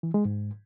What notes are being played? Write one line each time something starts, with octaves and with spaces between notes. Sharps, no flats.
E3
G#3
G#2